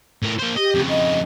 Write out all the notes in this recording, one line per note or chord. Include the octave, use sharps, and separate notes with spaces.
A2 A#4
A#3 C5
G4 D#5
F2 C#3
D#5